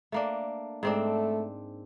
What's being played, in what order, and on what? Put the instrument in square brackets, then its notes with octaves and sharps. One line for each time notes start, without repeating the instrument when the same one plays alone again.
[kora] A3 A#3 D4
[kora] G#2 C4 D4 [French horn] A3